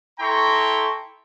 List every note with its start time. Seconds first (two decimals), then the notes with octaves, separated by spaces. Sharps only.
0.19 E4 A4 G5 A#5 C6 C#6